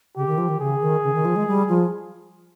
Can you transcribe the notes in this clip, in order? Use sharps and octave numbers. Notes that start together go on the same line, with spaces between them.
C#3 G4
D#3
F3
D#3
C#3 G#4
D#3
C#3
D#3
F3
G#3
G3
F3